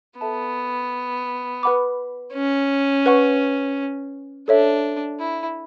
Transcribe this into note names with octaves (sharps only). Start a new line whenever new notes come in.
B3 A4 E5 A5
B4 F#5 B5 D6
C#4
B4 F#5 C#6
D4 A4 C#5 E5
E4